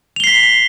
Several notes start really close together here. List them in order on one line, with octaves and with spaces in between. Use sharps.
F7 G7 C7 B6